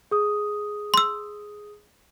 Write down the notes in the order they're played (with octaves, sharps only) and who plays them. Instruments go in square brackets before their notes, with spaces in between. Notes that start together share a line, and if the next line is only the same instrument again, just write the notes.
[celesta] G#4 D#6
[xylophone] C6 E6